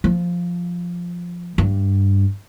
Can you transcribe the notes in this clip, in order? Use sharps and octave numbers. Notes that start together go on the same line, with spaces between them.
F3
G2